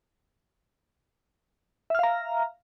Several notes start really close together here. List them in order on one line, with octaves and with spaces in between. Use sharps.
E5 F6 F5 A#5